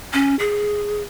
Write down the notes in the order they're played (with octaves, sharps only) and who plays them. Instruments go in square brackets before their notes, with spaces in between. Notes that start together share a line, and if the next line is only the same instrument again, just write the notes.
[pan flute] C#4
G#4